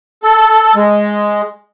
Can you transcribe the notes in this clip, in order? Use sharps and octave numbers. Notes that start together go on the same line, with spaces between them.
A4
G#3